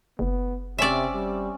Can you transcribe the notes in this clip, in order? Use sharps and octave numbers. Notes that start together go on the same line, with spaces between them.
F#1 B3
C3 C4 C#4 D5 E5
G3